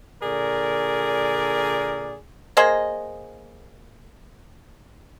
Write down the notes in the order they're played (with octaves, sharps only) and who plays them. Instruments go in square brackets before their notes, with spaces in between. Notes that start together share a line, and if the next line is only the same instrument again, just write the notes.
[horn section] A#2 D3 G#4 A#4 D5
[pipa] A#3 G#4 C5 D#5